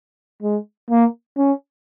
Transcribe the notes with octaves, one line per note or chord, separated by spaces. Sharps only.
G#3
A#3
C#4